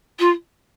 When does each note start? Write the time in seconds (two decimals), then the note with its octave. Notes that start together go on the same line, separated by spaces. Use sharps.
0.19 F4